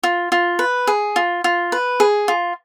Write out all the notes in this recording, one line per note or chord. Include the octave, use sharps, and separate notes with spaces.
F4
F4
B4
G#4
F4
F4
B4
G#4
F4